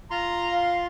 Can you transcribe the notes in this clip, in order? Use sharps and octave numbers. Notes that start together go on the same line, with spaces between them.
F4 A#5 C6
F5